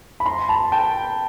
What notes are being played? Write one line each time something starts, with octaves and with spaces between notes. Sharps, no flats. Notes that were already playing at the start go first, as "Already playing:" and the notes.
B5
A#5 C6
A5 B5
G5 A5